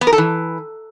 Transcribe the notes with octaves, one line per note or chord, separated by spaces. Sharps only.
B3
A#4
A4
E3